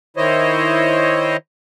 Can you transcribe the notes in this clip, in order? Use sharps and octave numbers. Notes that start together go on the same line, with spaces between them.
D#3 E4 C5 C#5 D#5